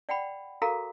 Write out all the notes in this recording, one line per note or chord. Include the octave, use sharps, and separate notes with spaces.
D5 F#5 G5 B5
F#4 A4 A#4 F5 A#5 D6